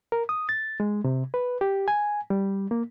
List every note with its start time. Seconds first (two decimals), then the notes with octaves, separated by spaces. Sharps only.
0.12 A#4
0.29 D#6
0.49 A6
0.80 G#3
1.04 C3
1.34 B4
1.61 G4
1.88 G#5
2.30 G3
2.71 A#3